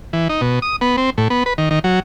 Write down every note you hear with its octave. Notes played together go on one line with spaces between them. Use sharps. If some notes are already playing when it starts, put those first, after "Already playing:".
E3
D#4
B2
D#6
B3
C4
A2
B3
B4
D#3
D#3
F#3